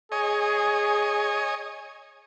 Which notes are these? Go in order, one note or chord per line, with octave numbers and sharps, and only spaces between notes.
G#4 C#5 D#5 G#5